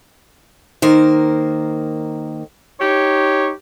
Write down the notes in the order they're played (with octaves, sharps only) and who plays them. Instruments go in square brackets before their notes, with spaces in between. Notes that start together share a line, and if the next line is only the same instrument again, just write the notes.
[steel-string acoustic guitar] D#3 A#3 C5
[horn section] D#4 G4 C#5